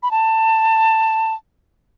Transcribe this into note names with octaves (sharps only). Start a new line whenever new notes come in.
B5
A5